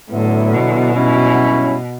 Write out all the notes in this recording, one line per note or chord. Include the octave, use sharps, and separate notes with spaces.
A2 D3 F#3 B3 E4
B2
G2 F#3 C#4 E4